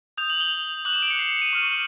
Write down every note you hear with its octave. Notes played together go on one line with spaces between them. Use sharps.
D#6 G6 F7
F#7
G7
D6 F#6 F#7
E7
D7
C#7
C7
C#7
D#7
C#6 F6